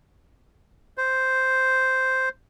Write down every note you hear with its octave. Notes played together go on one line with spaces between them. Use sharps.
C5